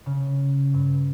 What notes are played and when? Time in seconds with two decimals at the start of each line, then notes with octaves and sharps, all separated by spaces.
0.06 C#3
0.74 G2